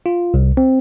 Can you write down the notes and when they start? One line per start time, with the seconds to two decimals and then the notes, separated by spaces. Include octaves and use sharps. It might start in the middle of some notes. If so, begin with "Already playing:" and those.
0.06 F4
0.34 C2
0.57 C4